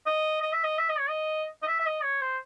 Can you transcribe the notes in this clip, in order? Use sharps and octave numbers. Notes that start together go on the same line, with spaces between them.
D#5
D#5
E5
D#5
E5
D#5
C#5
D#5
D#5
E5
E5
D#5
C#5
C5